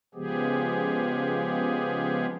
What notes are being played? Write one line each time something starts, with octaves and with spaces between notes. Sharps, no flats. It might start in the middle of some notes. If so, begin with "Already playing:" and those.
C#3 F3 G#3 B3 G4 G#4